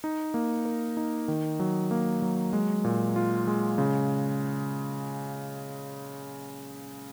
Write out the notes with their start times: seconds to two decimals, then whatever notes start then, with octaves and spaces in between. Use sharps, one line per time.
0.04 D#4
0.34 A#3
0.65 A#4
0.97 D#4
1.28 D#3
1.60 F#3
1.91 A#3
2.22 F#3
2.53 G#3
2.84 A#2
3.16 F4
3.47 G#3
3.78 C#3